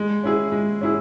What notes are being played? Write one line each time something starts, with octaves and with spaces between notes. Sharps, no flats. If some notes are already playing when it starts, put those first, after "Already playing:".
Already playing: G#3
C#4 E4 G#4
G#3
C#4 E4 G#4